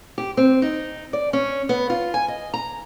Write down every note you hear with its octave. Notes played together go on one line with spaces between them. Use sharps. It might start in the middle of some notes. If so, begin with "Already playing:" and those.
G4
C4
D#4
D5
C#4
B3
F4
G#5
D#5
A#5